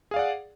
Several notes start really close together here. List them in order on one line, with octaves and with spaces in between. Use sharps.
G#4 F5 D5 F#5